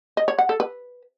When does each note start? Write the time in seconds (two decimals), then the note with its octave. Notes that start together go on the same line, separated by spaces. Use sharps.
0.17 D#5
0.28 C#5
0.38 F#5
0.49 A4
0.60 B4